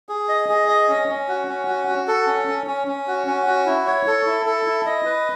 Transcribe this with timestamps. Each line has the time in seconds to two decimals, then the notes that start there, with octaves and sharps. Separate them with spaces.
0.09 G#4
0.29 D#5
0.49 G#4
0.68 D#5
0.89 C#4
1.08 C#4
1.28 F#4
1.47 C#4
1.67 F#4
1.88 F#4
2.08 A4
2.27 C#4
2.48 C#4
2.67 C#4
2.87 C#4
3.08 F#4
3.27 C#4
3.47 F#4
3.66 E4
3.86 C#5
4.07 A4
4.26 E4
4.46 A4
4.66 E4
4.86 D#5
5.05 B4